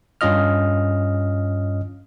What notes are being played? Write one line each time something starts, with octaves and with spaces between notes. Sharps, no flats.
G2 C#4 F4 D#5 F6